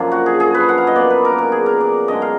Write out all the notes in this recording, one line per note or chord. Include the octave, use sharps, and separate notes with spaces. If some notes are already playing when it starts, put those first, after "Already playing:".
Already playing: F#2 D3 F3 A#3
F#4
G#4
G#4
B4
F#5
F5
D#5
B2 A#3 D5
B4
A#4
A#4
G#4
A#4
D5
F#2 D3 G#3 D#5
F5